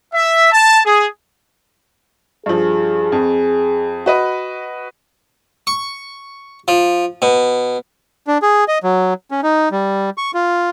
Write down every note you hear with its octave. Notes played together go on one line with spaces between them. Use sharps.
E5
A5
G#4
G2 F3 G#4
F2
F#4 B4 D#5
C#6
F3
B2
D4
G#4
D#5
F#3
C#4
D#4
G3
C#6
F4